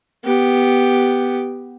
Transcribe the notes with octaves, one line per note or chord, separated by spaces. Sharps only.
B3 G4